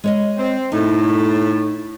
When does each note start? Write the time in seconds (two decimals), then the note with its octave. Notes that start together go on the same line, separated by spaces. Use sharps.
0.04 G#3 C#5 D#5
0.37 C4
0.72 A2 D#4